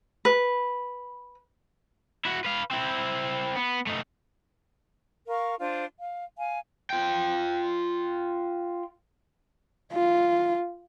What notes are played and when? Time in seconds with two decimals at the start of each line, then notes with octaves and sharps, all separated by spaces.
0.25 B4
2.25 E4 F#4
2.45 B4 F5
2.71 C4 E4
3.56 B3
3.87 A3 D#4
5.27 A#4 F5 C#6
5.59 D4 F4 C5
5.98 F5
6.37 F5 G#5
6.90 F4 G5
9.92 F4